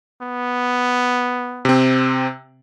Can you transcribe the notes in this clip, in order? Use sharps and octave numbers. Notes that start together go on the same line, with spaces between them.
B3
C3 C4